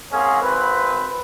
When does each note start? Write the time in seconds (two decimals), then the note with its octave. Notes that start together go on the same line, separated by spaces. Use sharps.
0.12 G#2 A#3 C4 C#4 G#4
0.42 G#1 C4 B4